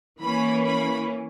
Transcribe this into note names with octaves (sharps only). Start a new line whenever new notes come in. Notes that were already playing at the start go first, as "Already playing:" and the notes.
E3 A#3 C#4 B5
B5